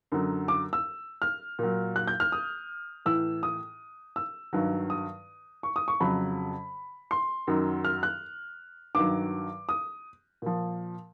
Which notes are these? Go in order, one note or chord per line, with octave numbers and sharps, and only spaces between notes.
F#2 D3 F#3
D6
E6
F6
A#2 F#3
F#6
G6
F6
D#6
A2 E3 E6
D#6
E6
G2 D#3 F#3
D#6
C#6
D#6
C#6
F2 C#3 F#3 B5
C6
F#2 D#3 F#3
F6
F#6
G2 D#3 F#3 D6
D#6
A#2 F3